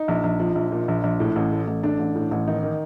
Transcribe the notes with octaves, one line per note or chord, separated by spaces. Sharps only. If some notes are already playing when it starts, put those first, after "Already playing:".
Already playing: D#4
A#1
A#1
F3
A#1
A#2
A#1
A#1
A2
A1
A3
A1
A3 D4
A1
A2
A1
D#3 D#4
D#3